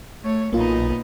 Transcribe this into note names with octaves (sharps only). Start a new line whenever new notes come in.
A3 C#5
B1 A#2 A#3 B3 D#4 F4